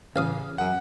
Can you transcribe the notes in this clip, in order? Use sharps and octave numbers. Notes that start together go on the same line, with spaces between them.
A1 C#3 F5 D#6
F#2 F#5